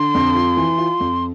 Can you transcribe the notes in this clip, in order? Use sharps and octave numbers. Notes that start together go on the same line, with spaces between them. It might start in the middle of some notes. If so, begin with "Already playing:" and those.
Already playing: D3 C6
F2
F4
E3
F4
F2